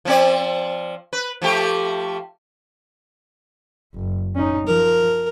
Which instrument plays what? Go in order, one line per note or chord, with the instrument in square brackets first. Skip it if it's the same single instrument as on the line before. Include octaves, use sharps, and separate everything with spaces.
[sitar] F3 C4 D5
B4
F3 A3 G4
[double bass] F#1
C#4 D#4
[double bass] F3 [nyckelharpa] A#4